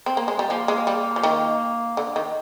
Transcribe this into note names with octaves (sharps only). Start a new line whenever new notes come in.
C4
A#3
G#3
G3
F3 A#3
G#3
G3
F3
D#3
D3
D#3